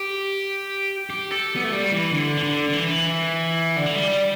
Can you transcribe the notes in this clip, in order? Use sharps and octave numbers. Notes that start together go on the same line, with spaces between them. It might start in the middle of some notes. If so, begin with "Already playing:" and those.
Already playing: G4
G4
A4
B3
A3
G3
E3
D3
E3
D3
D3
E3
D3
E3
G3